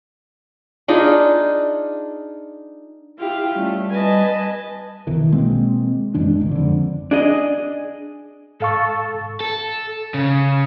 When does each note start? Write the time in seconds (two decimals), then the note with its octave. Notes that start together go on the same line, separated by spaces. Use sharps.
0.88 D4 D#4 F4 G#4
3.19 E4 F4 G4
3.55 G3 A3 C#4
3.90 B4 D#5 G#5 A5
5.07 B1 D#3 E3
5.31 B2 G#3 A#3 C4
6.14 F#2 E3 G#3 D4
6.40 G#1 C#2
6.51 F2 D3
7.11 D4 G#4 D#5
8.60 G#2 A4 F5 C#6
9.40 A4
10.14 C#3